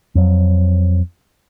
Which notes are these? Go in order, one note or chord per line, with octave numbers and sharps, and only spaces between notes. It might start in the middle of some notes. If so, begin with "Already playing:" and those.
F2 F#3